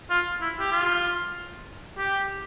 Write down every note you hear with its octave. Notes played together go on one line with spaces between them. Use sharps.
F4
E4
G4
F4
G4